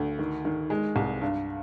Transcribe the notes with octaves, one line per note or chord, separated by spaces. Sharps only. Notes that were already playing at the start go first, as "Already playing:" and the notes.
Already playing: D2
D#3
D#3
G#3
C2
G2